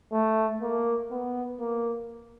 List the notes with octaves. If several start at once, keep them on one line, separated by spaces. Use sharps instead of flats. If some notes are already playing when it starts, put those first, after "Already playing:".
A3
A#3
B3
A#3